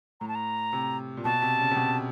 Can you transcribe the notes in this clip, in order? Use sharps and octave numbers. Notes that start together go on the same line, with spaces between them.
A2 A#5
A5
A#5
C3
A#2
B2 A5
C3
C#3
C3
B2